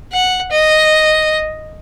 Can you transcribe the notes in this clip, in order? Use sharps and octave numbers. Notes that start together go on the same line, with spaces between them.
F#5
D#5